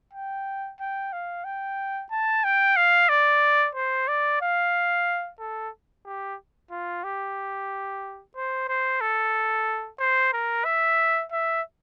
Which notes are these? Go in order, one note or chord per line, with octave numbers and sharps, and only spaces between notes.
G5
G5
F5
G5
A5
G5
F5
D5
C5
D5
F5
A4
G4
F4
G4
C5
C5
A4
C5
A#4
E5
E5